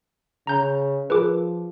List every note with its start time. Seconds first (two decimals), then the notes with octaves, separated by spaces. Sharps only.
0.47 C#3 A#5 G6
1.10 F3 F4 G#4 A#4 B4 D6